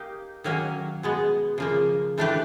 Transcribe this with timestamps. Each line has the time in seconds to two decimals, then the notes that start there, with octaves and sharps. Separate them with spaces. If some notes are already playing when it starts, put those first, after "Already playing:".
Already playing: A#3 D#4 G4
0.44 D#3 F#3 A#3 C#4
1.03 B2 G#3 B3
1.58 C#3 F3 A#3
2.18 E3 A3 D4 G4 B4